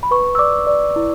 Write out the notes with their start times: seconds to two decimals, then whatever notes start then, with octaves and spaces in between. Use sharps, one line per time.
0.03 B5
0.11 B4 C#6
0.35 E6
0.39 D5 D6
0.67 D5
0.96 E4